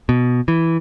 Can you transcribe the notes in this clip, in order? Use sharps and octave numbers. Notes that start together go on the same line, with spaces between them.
B2
E3